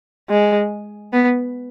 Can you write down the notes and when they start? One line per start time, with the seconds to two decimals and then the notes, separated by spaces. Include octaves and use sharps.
0.29 G#3
1.13 B3